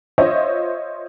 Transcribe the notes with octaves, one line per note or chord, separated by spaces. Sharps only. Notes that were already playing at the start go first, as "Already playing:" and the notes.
F4 C5 C#5 D#5 E5